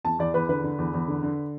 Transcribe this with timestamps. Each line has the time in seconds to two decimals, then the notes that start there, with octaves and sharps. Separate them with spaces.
0.04 E2 A5
0.19 E2 D5
0.34 E2 B4
0.49 D3 B4
0.64 D3
0.78 E2
0.94 E2
1.08 D3
1.23 D3